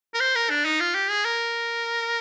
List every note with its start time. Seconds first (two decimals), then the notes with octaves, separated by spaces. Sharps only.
0.14 A#4
0.20 C5
0.35 A#4
0.50 D4
0.65 D#4
0.80 F4
0.95 G4
1.10 G#4
1.25 A#4